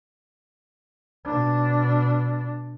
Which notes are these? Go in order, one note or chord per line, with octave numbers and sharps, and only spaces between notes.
B2 D4